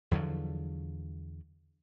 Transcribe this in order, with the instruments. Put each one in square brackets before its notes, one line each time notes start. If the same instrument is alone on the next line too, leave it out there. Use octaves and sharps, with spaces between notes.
[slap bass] E2 D3 F3 F#3